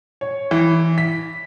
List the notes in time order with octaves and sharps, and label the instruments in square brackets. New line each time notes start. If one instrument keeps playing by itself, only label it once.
[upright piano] C#5
E3
B6